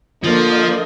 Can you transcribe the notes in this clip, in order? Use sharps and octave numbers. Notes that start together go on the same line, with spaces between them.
D3 F3 A#3 D#5